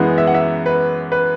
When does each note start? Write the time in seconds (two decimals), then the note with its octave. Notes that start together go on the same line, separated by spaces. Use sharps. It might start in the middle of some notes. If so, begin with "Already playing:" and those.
Already playing: F#2 E3 G#3 B3
0.18 E5
0.27 F#5
0.35 E5
0.66 B4
1.12 B4